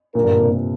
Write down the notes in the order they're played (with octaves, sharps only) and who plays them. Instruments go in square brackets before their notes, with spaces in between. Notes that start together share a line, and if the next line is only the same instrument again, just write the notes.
[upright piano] A#2 [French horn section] D3 G3 A#3 D4 A#4
[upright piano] G2
A#2
C3
A#2